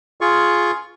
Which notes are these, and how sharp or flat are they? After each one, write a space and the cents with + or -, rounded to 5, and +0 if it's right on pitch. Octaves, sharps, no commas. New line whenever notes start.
F4 +0 G#4 +10 C#6 +0